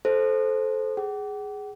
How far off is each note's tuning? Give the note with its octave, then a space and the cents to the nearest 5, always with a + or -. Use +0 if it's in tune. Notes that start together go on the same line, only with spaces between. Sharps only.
A4 -15 C5 +0
G#4 +0 F#5 +40